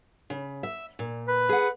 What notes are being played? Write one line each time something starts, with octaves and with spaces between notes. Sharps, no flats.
C#3
E5
A#2
B4
G#4 F#5